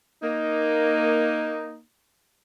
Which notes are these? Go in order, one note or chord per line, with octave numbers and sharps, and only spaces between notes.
A#3 D#4